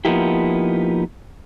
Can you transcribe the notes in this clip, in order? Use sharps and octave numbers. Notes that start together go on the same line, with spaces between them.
F3 A#3 B3 D#4 E4 G4